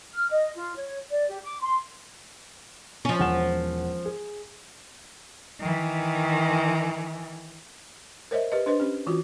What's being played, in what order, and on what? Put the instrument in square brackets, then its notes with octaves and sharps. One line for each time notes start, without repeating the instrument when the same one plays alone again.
[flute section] F6
D#5
F4
C#5
D5
G4
D6
C6
[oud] F3 C#4
[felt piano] E1 F#5 E7
G#4
[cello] D#3 E3
[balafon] A#4 C5 C#5 D#5 E5
G4 B4 D#5
D4 B4 C5 D#5
C#4 G4
E3 F4 F#4